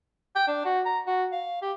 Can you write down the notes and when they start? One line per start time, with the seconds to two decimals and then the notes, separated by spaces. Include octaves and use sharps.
0.36 G5
0.47 D4
0.65 F#4
0.86 A#5
1.07 F#4
1.32 F5
1.62 G4